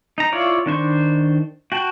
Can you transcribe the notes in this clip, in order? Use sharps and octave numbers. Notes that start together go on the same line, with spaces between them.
D#4 A#5
E4 F4 C#5 D5 F5
D#3 D4 C5 C#6
F#4 G5 A5